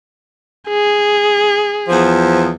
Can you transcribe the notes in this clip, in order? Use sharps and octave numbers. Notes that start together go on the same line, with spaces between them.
G#4
E2 F3